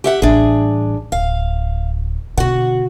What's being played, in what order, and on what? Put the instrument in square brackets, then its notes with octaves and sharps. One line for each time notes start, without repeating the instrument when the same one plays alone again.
[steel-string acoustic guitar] G4 E5 F#5
[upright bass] A1 G3 [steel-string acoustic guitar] D4 G#4
[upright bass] D1 [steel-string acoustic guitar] F5
[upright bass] B2 D3 [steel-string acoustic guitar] F#4 F#5